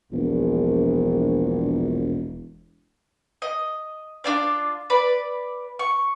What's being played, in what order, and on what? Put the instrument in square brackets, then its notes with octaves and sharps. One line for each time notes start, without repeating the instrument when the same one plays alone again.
[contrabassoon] E1 [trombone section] A#1
[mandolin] D#5
D4 F4 D5
B4 D5 B5
C#6